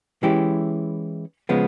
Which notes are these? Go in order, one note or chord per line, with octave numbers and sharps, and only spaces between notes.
E3 G#3 C#4 E4 G4
C#3 F3 G#3 B3